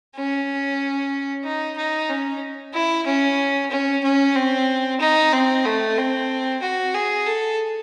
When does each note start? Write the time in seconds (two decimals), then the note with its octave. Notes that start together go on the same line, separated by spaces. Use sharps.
0.15 C#4
1.44 D#4
1.77 D#4
2.09 C#4
2.74 E4
3.06 C#4
3.71 C#4
4.03 C#4
4.36 C4
5.00 D#4
5.33 C4
5.65 A3
5.98 C4
6.62 F#4
6.94 G#4
7.26 A4